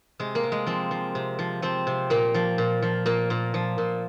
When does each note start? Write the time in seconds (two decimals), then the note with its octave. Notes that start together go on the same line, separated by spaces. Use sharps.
0.20 C3 G#3
0.35 A#3
0.43 C3
0.52 G#3
0.66 F3 C4
0.91 F3
1.15 C3
1.39 F3
1.62 F3 C4
1.87 C3
2.10 A#2 A#3
2.34 F3
2.58 A#2
2.82 F3
3.06 A#2 A#3
3.30 A#2
3.54 F3
3.78 A#2